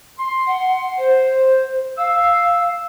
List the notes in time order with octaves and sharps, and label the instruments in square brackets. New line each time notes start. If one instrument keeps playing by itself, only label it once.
[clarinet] C6
[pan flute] F#5
C5
[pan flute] F5 [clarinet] E6